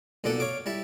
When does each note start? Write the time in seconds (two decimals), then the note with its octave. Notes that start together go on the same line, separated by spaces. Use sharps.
0.24 B1 A#2 D3 D4 A4 F#5
0.40 C#5 F5 D6
0.66 G3 E4 A5